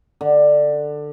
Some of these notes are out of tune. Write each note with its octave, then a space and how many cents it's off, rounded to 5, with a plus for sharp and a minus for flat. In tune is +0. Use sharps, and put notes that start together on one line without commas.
D3 +15